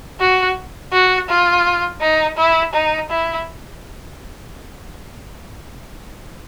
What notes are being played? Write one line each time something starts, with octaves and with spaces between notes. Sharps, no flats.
F#4
F#4
F4
D#4
E4
D#4
E4